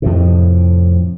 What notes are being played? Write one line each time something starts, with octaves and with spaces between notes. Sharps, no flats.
F2 A2 C3